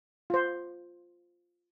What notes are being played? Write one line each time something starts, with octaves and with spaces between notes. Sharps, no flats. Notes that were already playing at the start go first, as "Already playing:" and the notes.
F4 C5